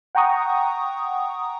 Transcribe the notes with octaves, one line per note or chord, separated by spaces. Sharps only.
F#5 G5 A#5 C#6 D#6